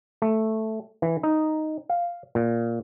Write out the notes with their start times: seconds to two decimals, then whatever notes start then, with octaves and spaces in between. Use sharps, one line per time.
0.22 A3
1.02 E3
1.23 D#4
1.89 F5
2.35 A#2